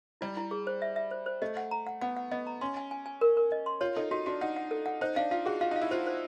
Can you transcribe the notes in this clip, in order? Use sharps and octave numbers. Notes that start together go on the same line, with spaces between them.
G3 E4
E4
G#4
C5
E5
E5
C5
C5
A3 D#5
F#5
A#5
F#5
B3 F#5
F#5
B3 D#5
A#5
C#4 C6
G#5
G#5
G#5
A#4
A#4
D#5
C6
F4 C#5
D#4 A4
D#4 F#4
D4 F#4
D#4 F#5
F#5
A4
F#5
D#4 C5
D4 F5
F4 F5
F#4 G#4
F4 F5
D#4 F5
E4
F4 C5
C5